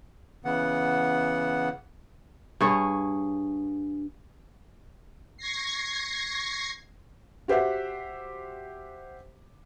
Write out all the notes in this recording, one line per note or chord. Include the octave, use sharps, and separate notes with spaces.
C#3 E3 B3 F#5
G2 G#4 C#5
C#6 G#6 A#6 C7
F#4 G4 C5 E5 F#5